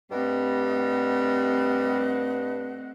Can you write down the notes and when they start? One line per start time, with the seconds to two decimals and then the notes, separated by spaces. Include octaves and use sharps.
0.11 G2 G3 A3 C4 D#5 F#5 F#6